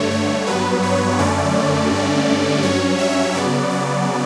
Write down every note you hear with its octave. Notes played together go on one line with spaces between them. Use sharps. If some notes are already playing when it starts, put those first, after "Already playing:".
Already playing: G2 D3 A3 C#5
C#5
G2 F#3 B3 B4
C#5
F#2 D3 A3 C#4 D5
G2 D3 A3 C#4
G2 F#3 C#4 C#5
E5
C#3 F#3 B3 D5
D5